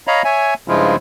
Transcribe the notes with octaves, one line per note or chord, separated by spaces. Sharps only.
C#5 D#5 F5 A#5 B5
C#5 E5 G#5
G2 C#3 F3 G#3 E4 F4